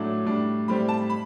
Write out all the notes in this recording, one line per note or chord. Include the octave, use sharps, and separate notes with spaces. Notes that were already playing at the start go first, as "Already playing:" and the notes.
Already playing: A2 F#3 A3 D4
A2 G3 D4
A2 G3 C4 B5
A5
B5